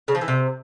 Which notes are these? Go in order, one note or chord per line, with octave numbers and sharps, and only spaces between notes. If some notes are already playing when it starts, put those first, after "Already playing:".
C#3
F3
E3
C3